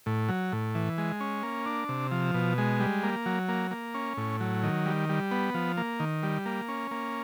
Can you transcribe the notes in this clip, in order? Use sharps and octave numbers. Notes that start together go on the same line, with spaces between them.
A2
F#3
A2
E3
G#3
C#4
A#3
D4
C3
F3
B2
G#3
G3
A#3
F#3
A#3
A#3
C#4
A2
F#3
D#3
G3
G3
B3
F3
A#3
D#3
G3
A#3
C#4
A#3